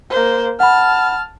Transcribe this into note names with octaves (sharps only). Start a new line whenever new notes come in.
A#3 C5
F#5 A5 B5 F6